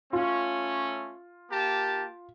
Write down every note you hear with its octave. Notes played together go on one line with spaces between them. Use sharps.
A3 C#4 F4
A#3 G4 A5